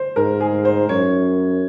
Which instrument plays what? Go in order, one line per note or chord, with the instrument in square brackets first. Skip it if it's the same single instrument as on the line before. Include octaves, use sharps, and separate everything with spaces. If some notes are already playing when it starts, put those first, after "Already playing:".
Already playing: [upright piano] C5
[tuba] G#2 [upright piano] A#4
[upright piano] G#4
C5
[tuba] F#2 [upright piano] C#5